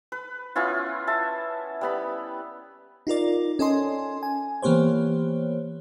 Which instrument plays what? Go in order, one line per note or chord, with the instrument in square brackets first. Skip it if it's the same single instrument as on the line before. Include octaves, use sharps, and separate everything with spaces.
[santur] B4
B3 C#4 E4 F4
E5 A5
G3 B3 B5
[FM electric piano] D#4 F4 A#4 D5
C#4 A4 D#5 G#5 C6
G#5
E3 A#3 B3 G4 C5 C#5